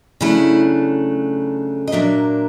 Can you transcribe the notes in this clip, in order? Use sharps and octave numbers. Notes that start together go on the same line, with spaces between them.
C#3 F#3 A3 D4 E4
D#5
A#2 F#3 A#3 D4 E5